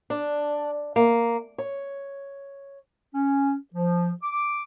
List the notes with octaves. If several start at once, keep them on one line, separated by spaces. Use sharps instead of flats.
D4
A#3
C#5
C#4
F3
D6